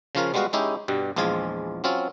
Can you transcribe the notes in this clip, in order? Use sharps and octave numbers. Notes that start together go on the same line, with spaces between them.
C#3 F3 C#4 F4 A#4
G3 G#3 B3 F#4 B4 F5
G#3 C#4 D#4 E4 G4
G2 B2 G3
A#1 E2 F3 G#3 F4 G#5
F#3 C4 C#4 F4